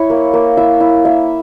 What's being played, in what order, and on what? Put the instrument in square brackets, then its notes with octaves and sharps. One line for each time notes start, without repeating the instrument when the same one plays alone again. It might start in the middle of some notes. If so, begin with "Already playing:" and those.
Already playing: [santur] E4 C#5
A#3
A#3
E4 E5
E4
A#3 E5